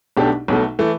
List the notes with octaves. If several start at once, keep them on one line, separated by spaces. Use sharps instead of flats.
B1 B2 A3 D4 G4
B1 B2 A3
E3 A3